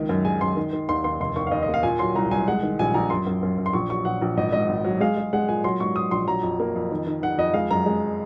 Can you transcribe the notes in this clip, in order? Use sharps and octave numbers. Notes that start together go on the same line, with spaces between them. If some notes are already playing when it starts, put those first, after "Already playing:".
Already playing: C#2 D#3
F#2
G#3 G#5
F#2 C6
D#3
D#3
D#2 C6
D#2 C6
F1 C6
D#2 C#6
F5
D#2 D#5
D#5
A#3
F5
A#2 G#5
F#3 C6
C2 A#5
C2 G#5
G#3 F#5
D#3
A#1 G#5
A#1 A#5
F#2 C6
F#2
F#2
F#2
C6
A#1 C#6
F#3 C#6
A#1 F#5
A#1
G#1 D#5
G#2 D#5
G#1
F#3
G#3 F5
G#3
G#3 F#5
A#2 G#5
F#3 C6
G#2 C#6
F#3 D#6
A#1 C6
F#3 A#5
F2
A#3
F2
D#3
D#3
D#3 F#5
F2 D#5
G#3 F5
F#2 A#5
G#3